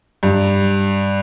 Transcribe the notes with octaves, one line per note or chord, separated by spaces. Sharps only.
G2